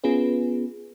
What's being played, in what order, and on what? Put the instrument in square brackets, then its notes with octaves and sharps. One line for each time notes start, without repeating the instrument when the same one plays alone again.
[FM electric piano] B3 C#4 F4 G#4 B4